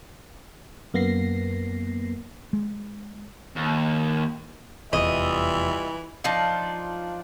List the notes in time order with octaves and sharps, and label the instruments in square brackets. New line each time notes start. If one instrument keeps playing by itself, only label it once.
[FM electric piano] F#2 A#3 B3 A#6 C7
[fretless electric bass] G#3
[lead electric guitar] D#2
[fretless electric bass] F1 E2 [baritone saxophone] E3 [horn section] G3 F4 E5 [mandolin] D#5
[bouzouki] F3 D4 D#4 F4